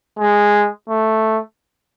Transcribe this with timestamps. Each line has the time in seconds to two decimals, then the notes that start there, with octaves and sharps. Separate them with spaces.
0.19 G#3
0.89 A3